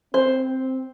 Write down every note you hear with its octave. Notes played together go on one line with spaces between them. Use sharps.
C4 C5